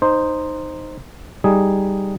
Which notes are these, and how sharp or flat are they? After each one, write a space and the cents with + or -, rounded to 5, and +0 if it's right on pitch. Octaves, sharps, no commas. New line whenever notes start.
D#4 -10 C5 +0
G3 +0 D#4 +0 G#4 +0